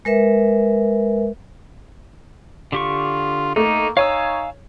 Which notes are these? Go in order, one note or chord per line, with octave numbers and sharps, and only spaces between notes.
G#3 A#4 B4 E5
D3 F4 G4 C#6
A3 A#3 D#4
D#4 C#5 F5 G#5 E6